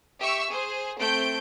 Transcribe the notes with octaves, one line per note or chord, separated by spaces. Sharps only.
G4 E5 C#6 E6
G#4 C5
A3 C4 G6 D7